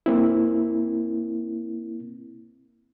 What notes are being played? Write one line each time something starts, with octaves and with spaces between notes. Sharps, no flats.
A#3 C4 E4